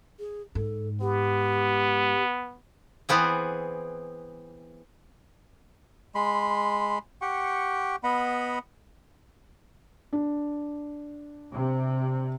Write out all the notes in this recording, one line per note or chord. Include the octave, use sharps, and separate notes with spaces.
G#4
G#2 A4
B3 G4
E3 B3 C4 G#4
G#3 B5 C6
G4 F#5 G5 C#6
B3 D#5 F#5 B5
D4
C3